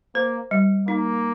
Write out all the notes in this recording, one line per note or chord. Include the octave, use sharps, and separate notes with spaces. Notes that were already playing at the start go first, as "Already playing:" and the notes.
A#3 C5
G3
A#3 D#4